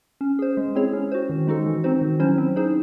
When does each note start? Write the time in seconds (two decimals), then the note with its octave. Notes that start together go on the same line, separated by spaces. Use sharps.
0.21 C#4
0.39 G#4 C5
0.57 G#3
0.75 C4 E4 G#4 C#5
0.93 C#4
1.12 F#4 C5
1.29 D#3
1.47 G#3 D#4 F#4 A4
1.66 E3
1.84 C4 D#4 F#4 C5
2.01 D#3
2.20 F#3 C#4 E4 C5
2.38 C4
2.56 D#4 G#4 C5